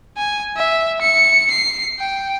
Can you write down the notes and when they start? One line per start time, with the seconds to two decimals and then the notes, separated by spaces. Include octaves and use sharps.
0.18 G#5
0.57 E5
1.01 C#7
1.50 C7
1.99 G5